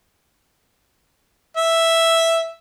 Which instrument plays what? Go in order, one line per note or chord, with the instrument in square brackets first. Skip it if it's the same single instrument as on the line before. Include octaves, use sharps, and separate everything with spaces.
[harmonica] E5